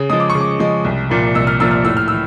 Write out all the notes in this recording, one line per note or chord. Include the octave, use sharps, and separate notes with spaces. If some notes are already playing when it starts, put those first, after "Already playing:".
Already playing: C#3
F3 G#3 D#6
D6
C#6
C#3
D6
F3 G#3
C2
A#2 F3 A#3
C2 E6
F6
A#2 F3 A#3 E6
F6
A2 E6
F6
E6
E3